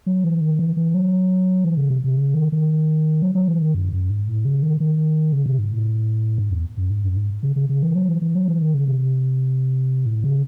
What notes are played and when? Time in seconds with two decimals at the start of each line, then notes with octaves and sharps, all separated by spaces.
0.06 F#3
0.24 E3
0.41 D#3
0.59 E3
0.77 E3
0.94 F#3
1.64 E3
1.77 C#3
1.90 C3
2.04 C3
2.17 C#3
2.34 D#3
2.52 D#3
3.22 F#3
3.35 F#3
3.48 E3
3.61 D#3
3.74 F#2
3.93 F#2
4.10 G#2
4.27 A2
4.45 C#3
4.63 D#3
4.80 D#3
5.32 C#3
5.46 C3
5.59 G#2
5.72 A2
6.38 G#2
6.51 E2
6.77 F#2
6.90 G#2
7.04 F#2
7.16 G#2
7.43 C#3
7.56 C#3
7.69 C#3
7.83 E3
7.95 F#3
8.08 E3
8.22 E3
8.35 F#3
8.48 E3
8.61 D#3
8.74 C#3
8.88 C3
10.06 A2
10.24 C#3